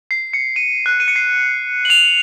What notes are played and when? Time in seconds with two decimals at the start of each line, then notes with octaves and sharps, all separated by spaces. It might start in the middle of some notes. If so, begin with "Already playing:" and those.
0.11 C7
0.33 C#7
0.56 D#7
0.86 F#6
1.00 D#7
1.08 C#7
1.16 C7
1.85 F#7
1.90 F7